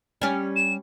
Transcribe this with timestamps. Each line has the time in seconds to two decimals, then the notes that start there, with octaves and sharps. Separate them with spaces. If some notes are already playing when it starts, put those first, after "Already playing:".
0.22 G3 C#4
0.56 E7